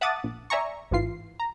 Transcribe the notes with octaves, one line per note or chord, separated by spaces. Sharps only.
E5 F#5 A5 D6 D#6 A6
A#1
D5 E5 G#5 A#5 C#6
A1 G#2 E3 F4 C7
A#5